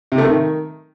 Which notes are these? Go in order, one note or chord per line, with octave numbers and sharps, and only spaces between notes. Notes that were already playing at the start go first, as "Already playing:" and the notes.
C3
A3
D#3